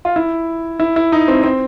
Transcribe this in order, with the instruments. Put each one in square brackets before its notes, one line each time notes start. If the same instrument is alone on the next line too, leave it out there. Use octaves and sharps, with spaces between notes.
[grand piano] F4
E4
E4
E4
D#4
C4
C4